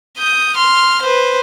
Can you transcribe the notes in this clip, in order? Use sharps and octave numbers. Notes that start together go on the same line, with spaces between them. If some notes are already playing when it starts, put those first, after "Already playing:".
D#6 G6
C6 F6
B4 C5